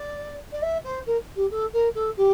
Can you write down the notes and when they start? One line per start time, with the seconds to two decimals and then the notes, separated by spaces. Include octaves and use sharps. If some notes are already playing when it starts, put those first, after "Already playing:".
Already playing: D5
0.52 D5
0.62 E5
0.84 C5
1.06 A#4
1.36 G4
1.50 A4
1.73 A#4
1.94 A4
2.17 G4